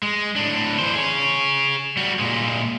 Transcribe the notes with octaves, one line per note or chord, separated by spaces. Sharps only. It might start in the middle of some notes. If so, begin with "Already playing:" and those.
G#3
A2 D4
E3 C5
G#4 C#5
G3 F#4
A#2 G#3